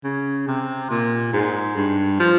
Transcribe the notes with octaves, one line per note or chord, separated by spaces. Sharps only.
C#3
C3
A#2
G#2
G2
F3